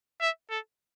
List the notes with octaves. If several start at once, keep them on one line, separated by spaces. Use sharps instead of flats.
E5
A4